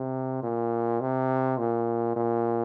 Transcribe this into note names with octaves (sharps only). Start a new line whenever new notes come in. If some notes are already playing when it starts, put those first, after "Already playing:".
Already playing: C3
A#2
C3
A#2
A#2